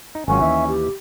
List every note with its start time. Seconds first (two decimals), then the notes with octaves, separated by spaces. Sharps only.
0.15 D#4
0.28 G#1 F#3 C#4 F4 G#5
0.40 D#2 E3 E5
0.68 G4